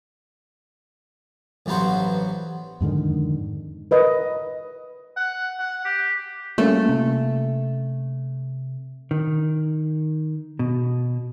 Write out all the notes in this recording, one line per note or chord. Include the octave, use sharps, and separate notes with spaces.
A1 G2 F#3 B3 F#4 C5
F2 G#2 D3 D#3
A#4 B4 D#5
F#5
F#5
G4
G3 A3 A#3 C#4
C3
D#3
B2